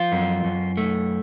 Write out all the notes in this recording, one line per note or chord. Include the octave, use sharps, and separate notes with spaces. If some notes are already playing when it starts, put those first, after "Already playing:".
Already playing: F3 F4
F#2
F#2
A3